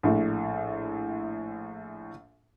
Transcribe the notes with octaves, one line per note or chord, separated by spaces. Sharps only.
A#1 A2